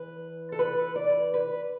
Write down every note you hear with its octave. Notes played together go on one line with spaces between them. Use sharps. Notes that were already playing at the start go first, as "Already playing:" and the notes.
Already playing: E2 E3 B4
A4
B4
D5
B4